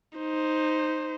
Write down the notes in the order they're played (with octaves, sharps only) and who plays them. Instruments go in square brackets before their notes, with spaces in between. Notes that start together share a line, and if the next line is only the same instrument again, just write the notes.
[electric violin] D#4 C5